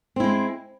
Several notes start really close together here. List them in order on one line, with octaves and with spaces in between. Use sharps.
C4 E4 G#3